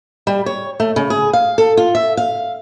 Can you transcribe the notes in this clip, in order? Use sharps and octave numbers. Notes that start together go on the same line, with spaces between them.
G3
C#5
A3
C#3
G#4
F5
A4
F4
E5
F5